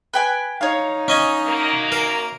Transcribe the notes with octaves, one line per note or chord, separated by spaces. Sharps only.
B4 G5 G#5
D#4 C#5 F5
C#4 D#5 G#5
F#2 A#3
A#4